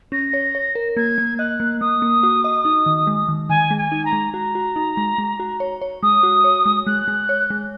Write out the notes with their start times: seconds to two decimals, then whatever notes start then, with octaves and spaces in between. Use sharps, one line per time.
0.12 C#4 A#6
0.33 C#5
0.55 C#5
0.75 A#4
0.97 A#3 G#6
1.18 A#3
1.39 D#5 F#6
1.60 A#3
1.81 A#3 D#6
2.02 A#3
2.23 F#4
2.44 D#5
2.65 D#4
2.86 D#3
3.07 G#3
3.29 D#3
3.49 D#3 G#5
3.71 G#3
3.78 G#5
3.92 D#4
4.05 A#5
4.13 G#3
4.34 F#4 A#5
4.55 F#4
4.76 D#4
4.97 G#3
5.18 G#3
5.40 F#4
5.60 C#5
5.81 C#5
6.03 G#3 D#6
6.23 F#4
6.44 C#5
6.66 G#3
6.87 G#3 F#6
7.08 G#3
7.29 C#5
7.50 G#3